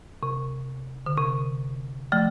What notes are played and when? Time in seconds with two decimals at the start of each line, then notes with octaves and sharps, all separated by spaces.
0.23 C3
1.06 D3
1.17 C3
2.12 F3 A3